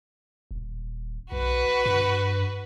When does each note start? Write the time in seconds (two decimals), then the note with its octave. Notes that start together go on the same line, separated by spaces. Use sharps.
0.51 D#1
1.32 B1 F#4 B4
1.86 G2